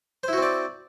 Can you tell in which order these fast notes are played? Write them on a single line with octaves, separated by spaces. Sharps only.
C5 E4 F#4 C4 D5